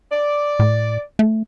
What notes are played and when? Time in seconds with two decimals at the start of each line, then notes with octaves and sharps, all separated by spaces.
0.11 D5
0.59 A2
1.19 A3